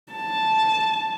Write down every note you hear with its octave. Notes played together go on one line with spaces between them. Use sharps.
A5